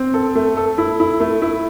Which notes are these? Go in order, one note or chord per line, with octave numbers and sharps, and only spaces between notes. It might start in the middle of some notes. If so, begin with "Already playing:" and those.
Already playing: C4
A4
A3
A4
E4
E4
A3
E4